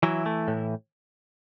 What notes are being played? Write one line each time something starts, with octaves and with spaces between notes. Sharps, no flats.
E3 F#3 E4
A3
A2